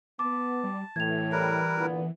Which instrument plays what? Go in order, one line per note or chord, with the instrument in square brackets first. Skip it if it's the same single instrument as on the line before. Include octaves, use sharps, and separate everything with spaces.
[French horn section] B3 [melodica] A5 [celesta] D6
[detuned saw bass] G3
[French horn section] A2 [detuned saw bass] E3 [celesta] G#6 F7
[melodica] G3 A#4 B4
[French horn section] A#2 D3 B3